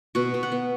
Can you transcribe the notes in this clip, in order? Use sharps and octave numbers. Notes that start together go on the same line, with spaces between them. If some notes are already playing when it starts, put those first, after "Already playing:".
B2 F#4
B2
F#5
B3